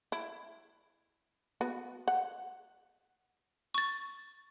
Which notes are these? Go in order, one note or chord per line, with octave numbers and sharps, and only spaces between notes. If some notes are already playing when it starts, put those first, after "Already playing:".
E4
B3 F#4 B4
F#5
C#6 A6